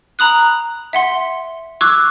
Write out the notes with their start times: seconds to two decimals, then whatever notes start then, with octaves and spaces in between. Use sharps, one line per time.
0.19 A#5 B5 D#6 F#6
0.93 E5 F#5 C6
1.81 C#6 D6 E6 F#6 G#6